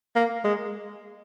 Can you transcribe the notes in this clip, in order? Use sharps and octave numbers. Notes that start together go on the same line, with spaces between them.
A#3
G#3